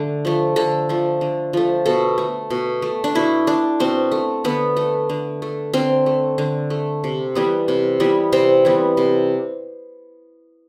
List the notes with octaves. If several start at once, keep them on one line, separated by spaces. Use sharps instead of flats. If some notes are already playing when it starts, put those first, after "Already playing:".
Already playing: D3 A3
F3 A3
D3 A4
F3 A3
D3
F3 A3
B2 A4
A3
B2
A3
D4
B2 E4
A3 D4
B2 C4
A3
D3 B3
A3
D3
A3
D3 C4
A3
D3
A3
C3
E3 G3 B3
C3
E3 G3 B3
C3 C4
E3 G3 B3
C3